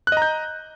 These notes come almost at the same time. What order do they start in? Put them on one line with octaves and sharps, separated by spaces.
F#6 D#5 A#5 G6